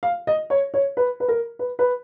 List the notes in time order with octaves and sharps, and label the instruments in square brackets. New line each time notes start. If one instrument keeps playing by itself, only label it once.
[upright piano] F5
D#5
C#5
C#5
B4
B4
A#4
B4
B4